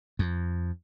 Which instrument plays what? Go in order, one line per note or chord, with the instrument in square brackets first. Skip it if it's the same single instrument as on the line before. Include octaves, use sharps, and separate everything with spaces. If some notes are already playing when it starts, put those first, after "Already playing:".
[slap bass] F2